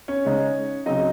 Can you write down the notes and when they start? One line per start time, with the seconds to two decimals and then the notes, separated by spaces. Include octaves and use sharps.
0.08 C#4 C#5
0.25 C#3 G#3 D#4
0.86 C#3 F#3 C4 D#4 D#5